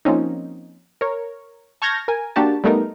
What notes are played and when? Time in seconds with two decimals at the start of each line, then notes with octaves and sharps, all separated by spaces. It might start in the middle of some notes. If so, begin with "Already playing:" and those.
0.05 F3 A#3 C4 C#4 D#4
1.01 A#4 C#5
1.82 A5 C#6 F6 G6 G#6 A#6
2.08 A#4 G#5
2.36 A#3 D4 F#4 G4 A5
2.64 G3 A3 B3 D#4 A#4